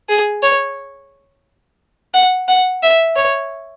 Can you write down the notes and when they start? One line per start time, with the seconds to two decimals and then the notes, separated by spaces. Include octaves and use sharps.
0.09 G#4
0.43 C#5
2.14 F#5
2.48 F#5
2.83 E5
3.16 C#5